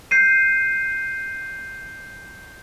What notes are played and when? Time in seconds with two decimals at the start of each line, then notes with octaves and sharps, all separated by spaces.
0.11 G6 C7 D#7